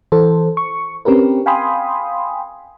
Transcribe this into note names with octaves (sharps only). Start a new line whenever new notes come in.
E3 A4 C5
C#6
C4 C#4 G4 A#4 B4
F5 G5 G#5 B5 C6 D#6